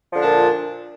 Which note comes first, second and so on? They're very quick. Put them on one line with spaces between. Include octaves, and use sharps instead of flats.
F3 D3 D4 A#2